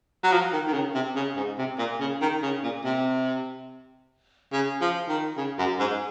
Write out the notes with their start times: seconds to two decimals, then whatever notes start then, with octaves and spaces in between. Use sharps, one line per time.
0.23 F#3
0.32 F3
0.53 D#3
0.67 D#3
0.73 C#3
0.94 C3
1.16 C#3
1.37 G#2
1.58 C3
1.78 A#2
2.00 C#3
2.21 D#3
2.43 C#3
2.63 A#2
2.84 C3
4.53 C#3
4.81 F3
5.09 D#3
5.37 C#3
5.58 F#2
5.80 G#2